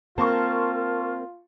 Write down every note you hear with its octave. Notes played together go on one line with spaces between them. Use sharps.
A#3 C4 F4 A#4 A5 C6 C#6